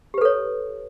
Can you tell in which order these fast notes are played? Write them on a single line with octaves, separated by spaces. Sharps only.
G4 B4 A4 C#5